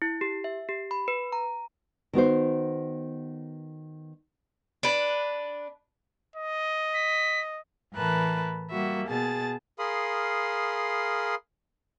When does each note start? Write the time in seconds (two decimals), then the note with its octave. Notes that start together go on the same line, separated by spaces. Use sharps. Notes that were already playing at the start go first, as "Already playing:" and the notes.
0.02 E4
0.21 G4
0.44 E5
0.69 G4
0.91 B5
1.08 B4
1.32 A#5
2.13 D#3 B3 F#4 C5
4.83 D4 B4
6.36 D#5
6.94 B6
7.95 A2 E3 A#4 B4 A5 F#6
8.71 G3 A#3 F#4 E5
9.08 B2 G#4 A5 A6
9.79 G#4 A#4 F5 B5 C6 D#6